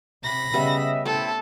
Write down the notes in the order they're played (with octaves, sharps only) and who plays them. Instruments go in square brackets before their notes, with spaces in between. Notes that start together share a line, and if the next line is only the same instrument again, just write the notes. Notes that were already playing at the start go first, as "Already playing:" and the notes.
[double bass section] C3 [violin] B5 A#6
[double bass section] C#3 [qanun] G3 B3 [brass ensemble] D#5 E5
[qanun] A3 [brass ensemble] C4 E4 [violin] A4